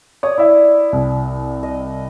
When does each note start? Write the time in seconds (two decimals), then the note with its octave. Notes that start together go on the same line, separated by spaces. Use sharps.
0.23 C#5 D5 D#6
0.38 E4 E5
0.92 C2
1.63 D#5